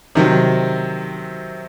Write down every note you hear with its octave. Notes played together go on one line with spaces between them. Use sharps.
C3 D#3 F#3